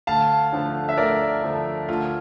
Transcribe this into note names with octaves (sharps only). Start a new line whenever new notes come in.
D2 F5 A5
D3 F3 A3
E5
D2 A#4 D5
D3 F3 A3
D2 F4